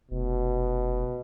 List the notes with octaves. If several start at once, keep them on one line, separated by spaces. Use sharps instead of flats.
F1 B2